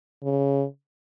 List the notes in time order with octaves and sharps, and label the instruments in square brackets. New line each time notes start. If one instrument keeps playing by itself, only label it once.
[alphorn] C#3